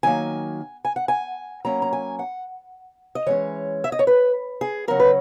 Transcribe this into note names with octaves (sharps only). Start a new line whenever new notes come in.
D#3 F#3 A#3 G#5
G#5
F#5
G#5
F#3 A#3 C#4 A#5
A#5
G#5
F#5
D#5
E3 G#3 C#4 C#5
E5
D#5
C#5
B4
G#4
C#3 F#3 C#4 A#4
B4